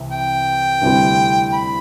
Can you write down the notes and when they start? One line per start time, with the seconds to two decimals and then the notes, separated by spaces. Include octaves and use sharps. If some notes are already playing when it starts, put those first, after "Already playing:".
Already playing: C2 C3 E3
0.11 G5
0.81 D2 C3 G3 C4 E4
1.53 B5